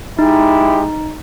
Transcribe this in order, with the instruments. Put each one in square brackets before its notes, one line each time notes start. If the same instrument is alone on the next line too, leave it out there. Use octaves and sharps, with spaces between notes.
[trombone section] G#3 E4 G4 [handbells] D#4